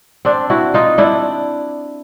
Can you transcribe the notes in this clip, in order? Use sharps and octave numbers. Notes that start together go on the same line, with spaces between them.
C4 D4
E4 F#4
D#4 F4
D4 E4